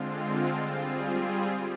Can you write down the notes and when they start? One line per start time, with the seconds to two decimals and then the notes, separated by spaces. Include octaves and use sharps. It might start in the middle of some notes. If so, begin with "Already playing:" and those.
Already playing: D3 G#3 C4 F4
0.54 G3 C4 F4 G#4
1.45 G4